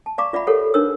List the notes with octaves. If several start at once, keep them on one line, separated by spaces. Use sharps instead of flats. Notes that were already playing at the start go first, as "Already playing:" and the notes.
A5
D5 F5 A#5 C#6 D6
F4 D5 E5 F#5 B5
G4 A4 A#4 C#5 F#5
D4 D#4 A#4 B4 C#5 E6